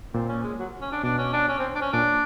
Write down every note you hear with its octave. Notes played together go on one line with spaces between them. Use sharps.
A#2 C4
C#4
G#3
F#3
C#4
D4
B2 D4
C#4
D4
C#4
C4
D4
C#4
A#2 D4